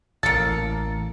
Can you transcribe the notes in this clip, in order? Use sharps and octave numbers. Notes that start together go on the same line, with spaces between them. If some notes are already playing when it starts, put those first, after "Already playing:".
A1 A#3 A4 A6 C#7